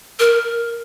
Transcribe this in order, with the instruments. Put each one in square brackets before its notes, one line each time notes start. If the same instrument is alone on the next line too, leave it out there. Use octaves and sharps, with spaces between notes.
[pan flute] A#4